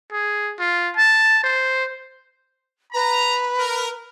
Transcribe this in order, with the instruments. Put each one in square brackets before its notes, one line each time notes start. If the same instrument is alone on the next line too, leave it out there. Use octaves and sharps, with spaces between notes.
[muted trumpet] G#4
F4
A5
C5
[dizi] B4 [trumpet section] A#5
[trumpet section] A#4